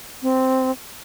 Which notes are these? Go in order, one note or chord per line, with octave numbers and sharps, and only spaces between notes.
C4